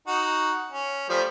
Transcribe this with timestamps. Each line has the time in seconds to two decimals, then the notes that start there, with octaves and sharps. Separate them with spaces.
0.07 D#4 F#4
0.72 C#4
1.09 F3 G3 A3